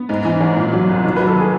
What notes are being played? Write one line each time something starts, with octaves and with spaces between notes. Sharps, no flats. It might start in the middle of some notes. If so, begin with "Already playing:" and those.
Already playing: B3
G#2
E3
A1
A#2
F#3
C2
D#3
B4
F#3
A4
G#4